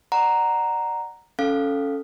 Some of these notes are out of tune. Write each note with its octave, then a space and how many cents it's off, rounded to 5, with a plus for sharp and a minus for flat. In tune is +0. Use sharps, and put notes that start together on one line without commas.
D5 +20 F#5 +5 A#5 +0
C#4 +0 A4 +0 F5 +0